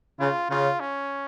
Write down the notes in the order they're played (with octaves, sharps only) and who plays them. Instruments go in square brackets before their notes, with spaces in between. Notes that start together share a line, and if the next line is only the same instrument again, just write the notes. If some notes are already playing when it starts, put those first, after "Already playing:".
[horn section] C#3 [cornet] F4
[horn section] C#3 [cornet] F4
[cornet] C#4